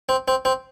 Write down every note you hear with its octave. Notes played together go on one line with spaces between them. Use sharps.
C4
C4
C4